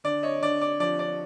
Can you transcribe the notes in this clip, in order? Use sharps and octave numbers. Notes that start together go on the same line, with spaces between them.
D3 D5
C#5 D#5
D3 D5
D5
F3 D5
D5